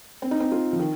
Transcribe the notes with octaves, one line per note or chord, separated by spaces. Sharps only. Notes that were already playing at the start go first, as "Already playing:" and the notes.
C4
D#4
C4
F4
F3
D#3